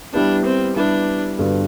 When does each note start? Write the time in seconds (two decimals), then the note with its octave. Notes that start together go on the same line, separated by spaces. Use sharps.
0.14 G3 B3 D4 E4 G4 B4
0.45 C4
0.76 G3 B3 D4 E4 G4 B4
1.39 G2 D3 G3 B3 F#4